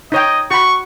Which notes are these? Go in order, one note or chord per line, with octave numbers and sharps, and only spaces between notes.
D#4 C#5 D#5 G5
F#4 B5 C#6